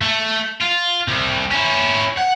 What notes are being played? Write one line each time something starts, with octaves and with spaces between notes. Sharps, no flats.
A3
F4
C2
C#4 E4
F#5